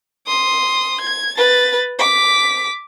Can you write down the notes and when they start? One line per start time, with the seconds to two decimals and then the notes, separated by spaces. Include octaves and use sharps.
0.27 C6 D#6
1.01 G#6
1.37 B4 A6
1.99 D6 B6